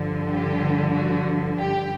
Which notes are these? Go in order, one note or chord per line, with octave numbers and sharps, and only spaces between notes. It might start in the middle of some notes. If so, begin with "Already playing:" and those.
Already playing: G2 D3 F3
G4
F#4
G4